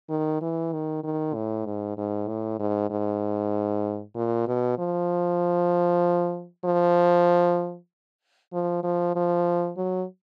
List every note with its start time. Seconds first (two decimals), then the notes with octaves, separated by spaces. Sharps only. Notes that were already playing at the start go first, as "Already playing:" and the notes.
0.10 D#3
0.41 E3
0.73 D#3
1.03 D#3
1.34 A2
1.66 G#2
1.97 G#2
2.28 A2
2.59 G#2
2.90 G#2
4.15 A#2
4.47 B2
4.78 F3
6.65 F3
8.53 F3
8.83 F3
9.16 F3
9.77 F#3